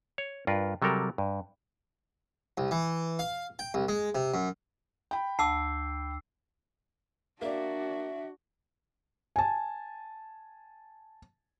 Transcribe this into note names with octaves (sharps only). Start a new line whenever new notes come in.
C#5
G2 F4 A#4 B4
C3 F#3 G3 A4 A#4
G2
C2
E3
F5
G5
C2
G#3
C3
F#2
G5 B5
D2 A5 D6 E6 C7
A#3 D4 F#4 D5 E5
G#5 A5